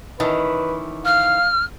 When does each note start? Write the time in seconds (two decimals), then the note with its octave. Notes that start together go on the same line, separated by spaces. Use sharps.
0.20 D#3 E3 C#4 B4
1.05 F5 F6